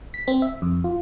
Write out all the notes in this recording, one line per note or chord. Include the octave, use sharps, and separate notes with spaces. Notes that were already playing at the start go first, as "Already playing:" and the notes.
B6
C4
E5
F2
F4